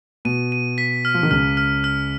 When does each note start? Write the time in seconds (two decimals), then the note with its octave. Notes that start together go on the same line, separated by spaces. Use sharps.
0.25 B2 D#7
0.52 D#7
0.78 B6
1.05 F6
1.14 F3
1.23 D#3
1.31 C#2 C#3 F6
1.57 F6
1.84 F6